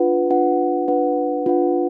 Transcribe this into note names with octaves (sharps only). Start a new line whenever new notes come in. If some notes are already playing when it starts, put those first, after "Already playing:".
Already playing: D4 F4 B4 F#5
D4 F4 B4 F#5
D4 F4 B4 F#5
D4 F4 B4 F#5